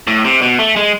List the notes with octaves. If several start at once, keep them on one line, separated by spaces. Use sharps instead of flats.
A2
C3
B2
A3
G#3